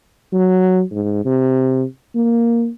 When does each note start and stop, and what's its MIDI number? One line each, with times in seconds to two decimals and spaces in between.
0.33 0.82 54
0.91 1.22 44
1.25 1.84 48
2.15 2.70 58